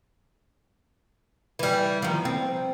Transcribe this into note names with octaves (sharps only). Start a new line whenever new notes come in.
E3 G3
D#3 F3
C4